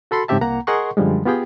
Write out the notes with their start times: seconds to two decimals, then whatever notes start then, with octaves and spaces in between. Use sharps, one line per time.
0.11 F#4 A4 B5 C6
0.28 G#2 C#3 C4 G4 E5 A5
0.41 C2 A#3 F#5 A#5
0.67 G#4 A#4 D#5 F#5 C6 C#6
0.97 F#2 D3 F3 G3 G#3
1.25 B3 F4 G4 G#4 G5